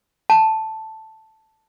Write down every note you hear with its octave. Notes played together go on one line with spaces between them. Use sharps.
A5